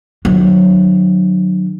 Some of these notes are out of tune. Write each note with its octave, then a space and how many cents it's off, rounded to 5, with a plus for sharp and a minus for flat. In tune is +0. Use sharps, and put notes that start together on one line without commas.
D3 +45 F#3 -10